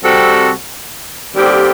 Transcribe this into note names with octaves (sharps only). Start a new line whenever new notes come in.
C3 G3 C4 F#4 A4
D#2 D3 G3 C4 G4